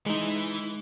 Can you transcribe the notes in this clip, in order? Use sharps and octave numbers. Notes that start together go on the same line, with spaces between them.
E3 G#3 D#4